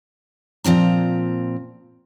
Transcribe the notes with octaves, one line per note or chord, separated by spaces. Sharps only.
A#2 F3 C4 A#5